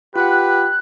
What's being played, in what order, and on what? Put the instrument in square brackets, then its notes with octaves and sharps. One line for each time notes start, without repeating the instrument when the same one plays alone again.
[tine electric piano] F4 F#5 [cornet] G4 [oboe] B4 [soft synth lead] F#6